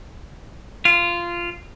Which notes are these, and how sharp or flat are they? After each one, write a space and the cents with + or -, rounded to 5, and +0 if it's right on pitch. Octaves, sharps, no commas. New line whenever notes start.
F4 -15